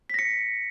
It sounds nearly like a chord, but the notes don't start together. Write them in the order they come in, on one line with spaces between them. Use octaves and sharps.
B6 A#6 C#7